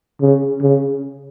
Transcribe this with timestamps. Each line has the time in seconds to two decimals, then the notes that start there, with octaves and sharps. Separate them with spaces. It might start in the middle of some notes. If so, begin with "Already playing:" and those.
0.21 C#3
0.62 C#3